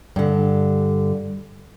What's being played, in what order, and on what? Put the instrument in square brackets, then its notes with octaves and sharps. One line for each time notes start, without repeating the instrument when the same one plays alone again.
[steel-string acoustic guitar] G2 D3